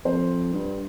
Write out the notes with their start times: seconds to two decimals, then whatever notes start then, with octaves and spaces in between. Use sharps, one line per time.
0.05 F2 C5
0.53 G2